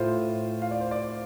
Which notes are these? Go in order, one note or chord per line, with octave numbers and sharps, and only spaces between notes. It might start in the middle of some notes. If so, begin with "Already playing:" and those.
Already playing: A2 A3 F4 C5
F5
D5
C5
D5